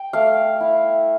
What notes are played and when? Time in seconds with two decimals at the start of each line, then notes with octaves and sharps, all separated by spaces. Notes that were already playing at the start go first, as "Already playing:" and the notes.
Already playing: G5
0.13 A3 F5
0.61 E4